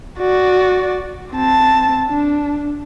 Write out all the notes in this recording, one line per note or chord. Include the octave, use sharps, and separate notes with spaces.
F#4 D5
C4 A5
D4